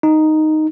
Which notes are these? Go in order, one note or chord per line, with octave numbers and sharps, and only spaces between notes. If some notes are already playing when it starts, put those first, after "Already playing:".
D#4